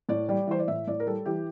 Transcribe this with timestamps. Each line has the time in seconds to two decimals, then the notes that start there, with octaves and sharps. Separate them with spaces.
0.09 A2 D5
0.29 G3 D5
0.48 E3 C5
0.59 D5
0.68 A2 E5
0.87 A2 D5
1.00 A#4
1.06 G3 A4
1.25 E3 G4